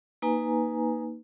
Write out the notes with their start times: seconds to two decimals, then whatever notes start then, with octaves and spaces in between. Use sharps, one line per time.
0.22 A#3 D#4 B4 G#5 A#5